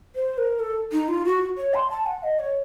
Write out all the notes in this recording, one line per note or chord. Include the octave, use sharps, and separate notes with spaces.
C5
A#4
A4
D#4
F4
F#4
C#5
C6
A5
F#5
D#5
C#5